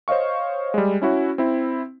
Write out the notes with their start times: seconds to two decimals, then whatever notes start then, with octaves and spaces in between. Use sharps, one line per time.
0.08 C5 C#5 D#5 F5 C#6
0.74 G3 G#3
1.02 C#4 E4 F#4 C#5
1.38 C4 E4